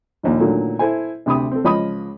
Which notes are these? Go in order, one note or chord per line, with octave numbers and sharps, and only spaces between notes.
A#1 D#2 A#2
A#2 D3 D#3 F#3 A3
E4 A4 C5 G#5
D2 C3 B5 D#6
C4 A4
C#2 F3 D#5 B5 D#6